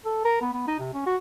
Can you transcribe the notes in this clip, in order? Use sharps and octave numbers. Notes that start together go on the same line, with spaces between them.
A4
A#4
B3
B3
D#4
C3
C#4
F#4